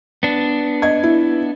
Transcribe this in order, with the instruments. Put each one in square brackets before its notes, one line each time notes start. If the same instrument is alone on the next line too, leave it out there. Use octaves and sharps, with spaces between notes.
[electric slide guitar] B3 D4
[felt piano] D#5 G#6
E4